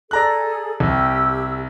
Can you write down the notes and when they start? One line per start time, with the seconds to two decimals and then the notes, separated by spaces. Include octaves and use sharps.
0.11 G#4 A4 D5 A#5 F#6
0.80 C2 G4 E6